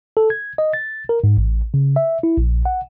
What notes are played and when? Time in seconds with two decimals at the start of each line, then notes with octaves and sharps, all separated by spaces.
0.17 A4
0.30 G#6
0.58 D#5
0.74 A6
1.09 A#4
1.24 G#2
1.37 A1
1.74 C#3
1.96 E5
2.23 E4
2.37 A#1
2.65 F#5